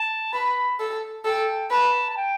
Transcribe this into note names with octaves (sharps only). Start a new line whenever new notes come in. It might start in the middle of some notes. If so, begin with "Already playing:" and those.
Already playing: A5
B4 B5
A4
A4 G5
B4 A5
A5
G5